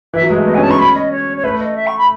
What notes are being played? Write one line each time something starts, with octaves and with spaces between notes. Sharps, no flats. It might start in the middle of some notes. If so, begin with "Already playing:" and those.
E3 E5
F#3
G#3
A3
B3 D#5
G#5
C#4
A5
C#4 C#6
B5
D#5
C#5
C#5
A3 B4
D#5
E5
C#6
B5